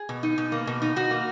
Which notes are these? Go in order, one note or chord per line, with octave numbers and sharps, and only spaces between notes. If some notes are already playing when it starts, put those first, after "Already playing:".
Already playing: G#4
B2
D#4
B2
A#3
B2
D#4
B2 F#4
A#3